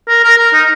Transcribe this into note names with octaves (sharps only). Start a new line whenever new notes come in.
A#4
A#4
A#4
D#4